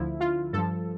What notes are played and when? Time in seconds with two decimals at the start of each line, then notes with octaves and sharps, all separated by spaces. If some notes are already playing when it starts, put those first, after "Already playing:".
Already playing: D2 D3 F3 E4
0.20 F4
0.53 G2 F3 A4